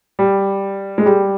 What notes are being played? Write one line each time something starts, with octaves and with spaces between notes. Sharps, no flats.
G3
G#3
G3